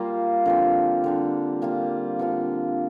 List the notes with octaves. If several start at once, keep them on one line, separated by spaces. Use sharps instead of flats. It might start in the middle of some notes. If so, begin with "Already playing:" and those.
Already playing: G3 A#3 F4
D3 F3 C4
D3 G3 D4
G3 A#3 F4
D3 F3 C4 F4